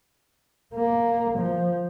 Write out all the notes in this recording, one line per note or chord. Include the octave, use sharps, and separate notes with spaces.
A#3
F3